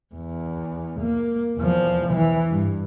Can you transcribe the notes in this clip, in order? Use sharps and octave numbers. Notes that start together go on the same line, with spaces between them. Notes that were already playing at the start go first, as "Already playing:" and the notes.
E2
A#3
E2 F3
E3
G2